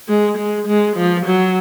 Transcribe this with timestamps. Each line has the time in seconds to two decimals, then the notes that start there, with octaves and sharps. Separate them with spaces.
0.09 G#3
0.38 G#3
0.67 G#3
0.97 F3
1.26 F#3